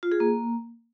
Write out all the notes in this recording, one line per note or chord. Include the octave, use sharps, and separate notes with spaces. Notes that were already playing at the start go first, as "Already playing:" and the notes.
F4
G#4
A#3